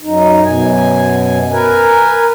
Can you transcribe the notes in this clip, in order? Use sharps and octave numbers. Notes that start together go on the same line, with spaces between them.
F#2 D#4
F#2 B2 G#5
A#4 B4 G#5